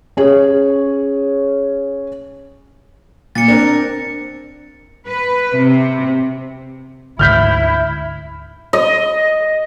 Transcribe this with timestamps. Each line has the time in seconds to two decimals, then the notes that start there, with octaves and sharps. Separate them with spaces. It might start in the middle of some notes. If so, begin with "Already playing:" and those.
0.17 C#4 G#4 C#5
3.35 A#2 A6 C#7
3.48 C4 D4 A#4
5.07 B4
5.56 C3
7.19 D2 G#2 D3 E4 F6 G6 B6
8.73 D#5